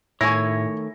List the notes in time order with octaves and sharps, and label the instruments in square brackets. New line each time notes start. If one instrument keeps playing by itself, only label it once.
[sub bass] A2 [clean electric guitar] D#3 A3 C#5 [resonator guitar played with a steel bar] E4 G#5 [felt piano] C#6 A#6